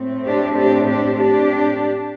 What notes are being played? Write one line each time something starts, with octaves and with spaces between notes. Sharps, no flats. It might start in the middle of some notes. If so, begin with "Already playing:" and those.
Already playing: A2 A3 C4
D4 G4
D4 G4
D4 G4
D4 G4